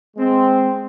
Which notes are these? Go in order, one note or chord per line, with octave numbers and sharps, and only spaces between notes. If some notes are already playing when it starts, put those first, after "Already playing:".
G#3 C4